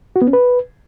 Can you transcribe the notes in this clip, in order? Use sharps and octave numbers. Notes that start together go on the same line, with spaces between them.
F#4
B3
C#4
B4